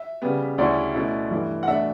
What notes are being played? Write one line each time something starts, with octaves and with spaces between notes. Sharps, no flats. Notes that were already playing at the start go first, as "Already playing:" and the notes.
Already playing: E5
C#3 G3 B3
D2 C#3 G3 C#4 E4 D5
B2 A3 C#4 E4
G2 E3 A3
F#5
E2 B2 A3 D4 E5